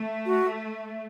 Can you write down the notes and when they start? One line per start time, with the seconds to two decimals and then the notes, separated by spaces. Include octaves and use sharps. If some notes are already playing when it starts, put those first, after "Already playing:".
Already playing: A3
0.26 F#4